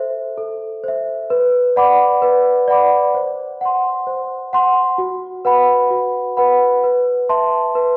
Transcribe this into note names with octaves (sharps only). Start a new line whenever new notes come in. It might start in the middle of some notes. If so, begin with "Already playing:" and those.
Already playing: A4 C5 E5
A4
C5 E5
B4
D5 F#5 B5 D6
B4
D5 F#5 B5 D6
C5
F#5 C6
C5
F#5 C6
F#4
B4 F#5 B5
F#4
B4 F#5 B5
B4
E5 A5 C6
B4